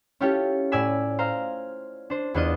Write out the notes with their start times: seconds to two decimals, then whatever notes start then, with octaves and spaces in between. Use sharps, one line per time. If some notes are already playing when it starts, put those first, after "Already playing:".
0.21 C#4 E4 F4 G4 A4 C#5
0.72 A2 D5 G#5 E6 B6
1.19 C5 F5 A#5
2.10 D4 C5
2.34 E2 B3 D4 F4 D#5